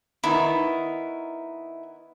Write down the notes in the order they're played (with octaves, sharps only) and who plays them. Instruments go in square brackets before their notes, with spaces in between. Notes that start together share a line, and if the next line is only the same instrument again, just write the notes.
[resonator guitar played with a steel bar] D#3 B3 D#4 [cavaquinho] E4